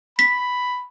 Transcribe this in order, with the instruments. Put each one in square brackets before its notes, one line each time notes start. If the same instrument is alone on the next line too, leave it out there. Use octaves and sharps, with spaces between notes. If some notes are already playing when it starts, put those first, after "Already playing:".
[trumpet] B5 [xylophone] B6